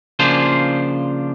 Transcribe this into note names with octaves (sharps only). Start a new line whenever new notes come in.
C#3 F3 A#3 D4 F4 C5